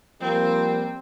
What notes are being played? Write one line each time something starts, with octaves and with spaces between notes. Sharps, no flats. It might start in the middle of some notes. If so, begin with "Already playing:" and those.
F3 G3 A#3 C4